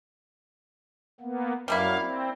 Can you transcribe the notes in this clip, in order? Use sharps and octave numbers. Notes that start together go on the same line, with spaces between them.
A#3 B3
F#2 F#3 G3 A#3 E4 F5
C4